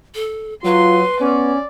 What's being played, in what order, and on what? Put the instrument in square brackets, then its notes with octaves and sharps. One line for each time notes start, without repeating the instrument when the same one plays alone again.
[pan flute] A4
[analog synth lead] F#3 [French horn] F4 [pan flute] B4 [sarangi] C6
[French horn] B3 [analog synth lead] C#4 [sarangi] D5